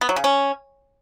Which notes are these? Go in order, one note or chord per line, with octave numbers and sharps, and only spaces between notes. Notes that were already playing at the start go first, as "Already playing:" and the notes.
B3
F#3
C#3
C#4